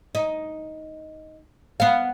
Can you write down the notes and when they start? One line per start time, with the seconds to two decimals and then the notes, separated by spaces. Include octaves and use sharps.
0.15 D#4
1.80 B3 F5